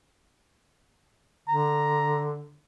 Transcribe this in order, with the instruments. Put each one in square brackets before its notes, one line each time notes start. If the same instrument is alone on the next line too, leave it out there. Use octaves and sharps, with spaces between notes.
[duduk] D3 [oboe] A#5